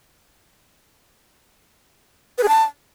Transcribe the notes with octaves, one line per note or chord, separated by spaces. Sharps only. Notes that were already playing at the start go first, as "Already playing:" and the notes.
B4
G#4
A5